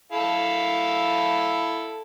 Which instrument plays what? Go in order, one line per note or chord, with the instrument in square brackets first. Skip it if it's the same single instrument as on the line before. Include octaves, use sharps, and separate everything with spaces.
[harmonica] E4 A4 F5